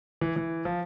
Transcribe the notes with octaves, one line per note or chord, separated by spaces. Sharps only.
E3
E3
F3